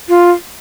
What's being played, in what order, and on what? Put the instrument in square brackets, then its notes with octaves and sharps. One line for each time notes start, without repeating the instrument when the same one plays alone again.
[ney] F4